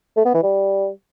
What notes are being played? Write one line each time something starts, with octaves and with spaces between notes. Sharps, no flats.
A3
B3
E3
G3